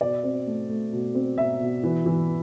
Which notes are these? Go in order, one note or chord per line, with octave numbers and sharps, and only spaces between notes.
B2 D5
C4
A3
A3
B2
C4
B2 E5
B2
E3
E3